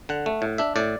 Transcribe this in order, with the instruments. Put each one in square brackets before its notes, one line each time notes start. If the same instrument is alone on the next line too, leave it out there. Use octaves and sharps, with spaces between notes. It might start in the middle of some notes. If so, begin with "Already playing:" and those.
[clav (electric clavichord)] D3 F#5
A3
A2
D4 E5
A2 D5